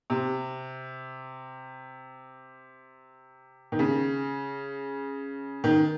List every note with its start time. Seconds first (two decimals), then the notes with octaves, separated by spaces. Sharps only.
0.10 C3
3.72 D#3
3.79 C#3
5.64 D#3